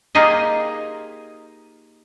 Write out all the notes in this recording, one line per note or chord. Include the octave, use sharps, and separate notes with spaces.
A#3 D#4 F4 G4 G#4 D#5